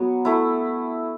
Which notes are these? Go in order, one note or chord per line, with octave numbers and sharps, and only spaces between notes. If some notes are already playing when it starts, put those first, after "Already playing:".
Already playing: F#3 B3
A3 E4